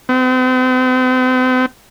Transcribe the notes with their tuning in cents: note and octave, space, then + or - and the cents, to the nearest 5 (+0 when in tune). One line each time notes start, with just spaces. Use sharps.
C4 -40